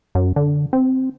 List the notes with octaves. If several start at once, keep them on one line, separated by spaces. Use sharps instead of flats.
F#2
D3
C4